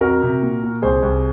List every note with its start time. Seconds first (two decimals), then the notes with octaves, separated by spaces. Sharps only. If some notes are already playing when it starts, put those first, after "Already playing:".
0.01 F2 F#4 A#4
0.22 C3
0.42 A#2
0.62 A#2
0.82 C2 G#4 C5
1.02 C2